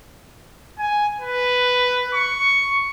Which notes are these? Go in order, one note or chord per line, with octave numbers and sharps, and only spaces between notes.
G#5
B4
C#6